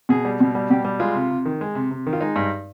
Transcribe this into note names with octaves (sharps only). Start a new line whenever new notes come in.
B2 G#4
G3
B2
G3
B2 G4
G3
G#3 F4
C3
C3
D#3
G#3
C3
C3
D#3
F4
G#3 D#4
G2